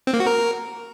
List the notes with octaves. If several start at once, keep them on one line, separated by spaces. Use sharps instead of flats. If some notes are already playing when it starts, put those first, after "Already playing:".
C4
A#3
F#4
A#4